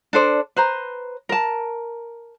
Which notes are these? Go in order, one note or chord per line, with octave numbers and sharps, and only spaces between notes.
D4 A4 C5 D5
B4 C5 A#5
A#4 A5